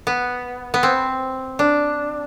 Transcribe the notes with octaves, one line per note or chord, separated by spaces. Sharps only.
B3
B3
C4
D4